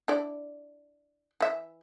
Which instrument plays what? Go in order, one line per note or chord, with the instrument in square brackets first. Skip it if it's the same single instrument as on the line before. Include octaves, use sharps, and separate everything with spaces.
[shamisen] D4 E4 D5
E3 E5